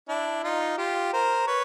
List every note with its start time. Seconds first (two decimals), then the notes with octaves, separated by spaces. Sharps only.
0.09 D4 E4
0.43 D#4 F4
0.78 F4 G4
1.13 A#4 C5
1.47 B4 C#5